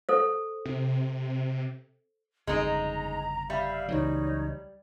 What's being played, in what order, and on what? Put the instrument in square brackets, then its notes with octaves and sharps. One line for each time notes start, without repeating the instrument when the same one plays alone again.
[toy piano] A4 C5
[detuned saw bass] C3
[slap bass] G1 F2 C#3 [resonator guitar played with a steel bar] G#3 D#4 [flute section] A#5
[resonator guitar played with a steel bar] G3 [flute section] E5 F5
[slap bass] C#2 E3 F#3 [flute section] D#4 C#5